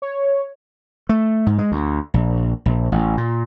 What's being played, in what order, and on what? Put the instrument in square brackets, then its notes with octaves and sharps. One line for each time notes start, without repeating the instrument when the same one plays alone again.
[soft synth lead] C#5
[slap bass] A3
G#2
G#3
D2
A#1
A#1
A1
A#2